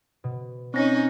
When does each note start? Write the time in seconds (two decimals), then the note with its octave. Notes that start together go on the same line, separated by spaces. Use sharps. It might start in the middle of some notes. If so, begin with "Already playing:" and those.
0.24 B2
0.74 C4 C#4 D#4 A#6